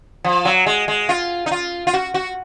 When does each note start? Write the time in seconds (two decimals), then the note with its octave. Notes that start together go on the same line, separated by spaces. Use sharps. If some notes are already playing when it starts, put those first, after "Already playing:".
0.24 F3
0.45 F#3
0.66 G#3
0.88 G#3
1.09 F4
1.46 D#4
1.51 F4
1.87 F4
1.94 F#4
2.14 F#4